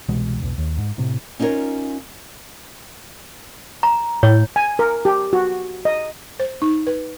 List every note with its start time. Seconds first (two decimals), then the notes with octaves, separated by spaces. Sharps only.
0.09 C2 B2 E3 G#3
0.40 E1 B1 B2
0.58 D#2
0.78 G#2
0.98 A2 C3
1.39 C#4 D#4 F4 G4 A#4 C#5
3.83 A#5
4.23 A2 C#5
4.56 G#5
4.79 A#4
5.05 G4
5.33 F#4
5.85 D#5
6.40 C5
6.62 D#4
6.87 B4